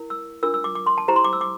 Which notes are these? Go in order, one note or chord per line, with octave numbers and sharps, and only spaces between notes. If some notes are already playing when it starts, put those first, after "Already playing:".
Already playing: E4 A#4
E6
D4 F4 A#4 E6
E6
D6
D6
C6
A5
E4 G4 C5 A#5
C6
D6
E6
D6